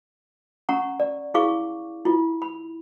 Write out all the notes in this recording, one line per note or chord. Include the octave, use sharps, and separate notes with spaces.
C#4 F#5 A#5 C#6
D5
E4 G#4 F5 C#6 D6
E4 F4
B5